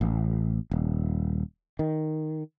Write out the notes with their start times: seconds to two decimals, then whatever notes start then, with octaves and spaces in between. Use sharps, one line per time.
0.01 A1
0.71 D#1
1.79 D#3